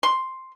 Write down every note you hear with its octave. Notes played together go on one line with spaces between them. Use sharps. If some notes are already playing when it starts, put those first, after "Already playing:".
C6